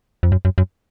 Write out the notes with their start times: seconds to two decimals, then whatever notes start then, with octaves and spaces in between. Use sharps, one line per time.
0.23 F2
0.32 F#2
0.45 F#2
0.58 F#2